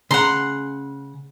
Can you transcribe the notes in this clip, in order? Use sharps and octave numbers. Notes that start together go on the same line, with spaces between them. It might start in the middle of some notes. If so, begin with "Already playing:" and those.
C#3 F#5 A#5 C6